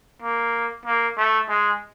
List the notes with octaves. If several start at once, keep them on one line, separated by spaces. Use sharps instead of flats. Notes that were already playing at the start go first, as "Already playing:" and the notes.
A#3
A#3
A3
G#3